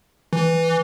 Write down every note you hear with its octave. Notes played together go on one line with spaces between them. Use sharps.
E3